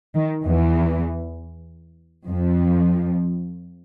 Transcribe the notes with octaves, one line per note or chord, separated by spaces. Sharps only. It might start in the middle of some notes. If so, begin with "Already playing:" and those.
D#3
E2 E3
F2 F3